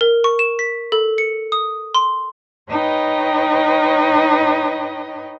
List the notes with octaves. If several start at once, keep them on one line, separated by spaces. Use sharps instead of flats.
A#4
C#6
E7
B6
A4
C#7
D#6
C6
D#4 B4 C#5 D#5 G5